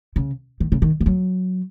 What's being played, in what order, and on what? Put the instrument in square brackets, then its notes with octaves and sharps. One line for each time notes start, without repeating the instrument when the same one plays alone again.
[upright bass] C#3
D#3
C#3
D#3
D#3
F#3